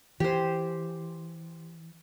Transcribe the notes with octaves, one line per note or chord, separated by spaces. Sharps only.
E3 G4 C5